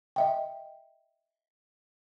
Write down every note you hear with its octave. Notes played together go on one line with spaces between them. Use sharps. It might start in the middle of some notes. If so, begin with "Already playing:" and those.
D#5 E5 G5